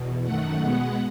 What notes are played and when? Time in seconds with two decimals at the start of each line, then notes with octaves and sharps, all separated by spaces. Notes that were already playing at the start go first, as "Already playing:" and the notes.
Already playing: E2 B2
0.25 F#2 D#3 A3 F#5
0.61 B2 G#3 B3